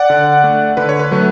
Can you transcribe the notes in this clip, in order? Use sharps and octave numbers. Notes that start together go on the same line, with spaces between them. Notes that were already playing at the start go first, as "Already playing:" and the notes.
Already playing: D5 F#5
D3
A3
D3 B4
C#5
B4
F#3 A3